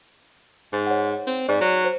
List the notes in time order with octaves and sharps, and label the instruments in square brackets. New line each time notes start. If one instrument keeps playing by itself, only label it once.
[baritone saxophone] G#2
[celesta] C#5 F#5
[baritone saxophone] C4
[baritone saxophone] G#2 [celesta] D5
[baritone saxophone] F#3
[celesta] C5